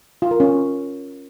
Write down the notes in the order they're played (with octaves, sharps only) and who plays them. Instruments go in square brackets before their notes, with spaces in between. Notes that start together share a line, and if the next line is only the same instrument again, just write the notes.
[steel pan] F4
A#4
C#4